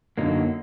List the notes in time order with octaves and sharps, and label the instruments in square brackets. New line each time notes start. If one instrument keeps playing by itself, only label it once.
[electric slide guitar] F#2 D3 F#3 A#3 D#4